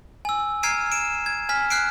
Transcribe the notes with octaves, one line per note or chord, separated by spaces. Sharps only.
G#5 E6
A#5 F6 G#6 C7 D7 D#7
D7 E7
G#6
G#5 F6 B6
F6 F#6 C7 D7